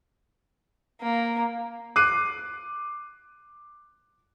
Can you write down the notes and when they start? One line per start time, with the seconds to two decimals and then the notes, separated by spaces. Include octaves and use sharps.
1.01 A#3
1.96 D6 F#6 C7 D#7